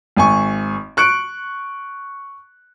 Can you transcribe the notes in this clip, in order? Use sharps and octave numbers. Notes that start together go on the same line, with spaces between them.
G#1 G#5 C#6
C#6 F#6 C#7 D7